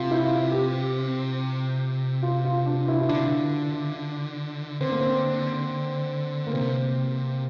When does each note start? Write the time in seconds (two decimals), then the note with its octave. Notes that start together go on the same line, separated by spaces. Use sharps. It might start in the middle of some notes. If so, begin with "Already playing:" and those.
Already playing: C3 F4
0.11 E4
0.23 F4
0.52 G4
2.23 F4
2.45 F4
2.66 D4
2.88 E4
3.01 E4
3.09 D3 D4
3.19 C3
3.28 D3
4.81 D3 C4
4.91 A#3
5.00 C4
6.47 A#3
6.52 C3 C4